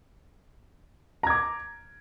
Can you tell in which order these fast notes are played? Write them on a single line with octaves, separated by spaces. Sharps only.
A#5 G#6 D6